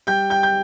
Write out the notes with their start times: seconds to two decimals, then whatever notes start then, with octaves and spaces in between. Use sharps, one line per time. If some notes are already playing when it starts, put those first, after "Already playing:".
0.07 G3 G5 G6
0.30 G5 G6
0.43 G6